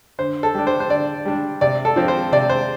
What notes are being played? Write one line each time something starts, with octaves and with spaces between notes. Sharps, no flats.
D3 C5
A4
G3 D4
C5
C5
D3 D5
G3 D4
C3 D5
A4
F3 C4
C5
C3 D5
C5